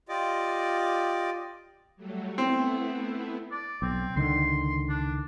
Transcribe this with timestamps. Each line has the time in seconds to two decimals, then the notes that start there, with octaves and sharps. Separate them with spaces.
0.09 F4 G4 D5 D#5 D6
1.97 F#3 G3 A3
2.38 A3 B3 C4 E4
3.51 D5
3.82 B1 C4
4.16 C#2 D3 D#3 C6
4.89 D4